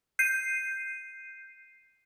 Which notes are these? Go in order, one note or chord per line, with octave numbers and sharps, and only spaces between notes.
G6 C7 D#7